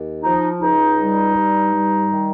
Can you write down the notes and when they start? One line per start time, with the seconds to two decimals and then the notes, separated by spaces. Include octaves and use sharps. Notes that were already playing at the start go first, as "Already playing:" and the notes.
Already playing: D#2
0.23 F3 D#4
0.61 C#2 D#4
0.99 G3
1.36 G2
1.74 G3
2.11 D#3